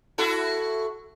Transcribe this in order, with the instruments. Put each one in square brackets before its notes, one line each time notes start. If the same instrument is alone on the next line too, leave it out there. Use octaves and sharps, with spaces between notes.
[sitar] E4 F#4 A4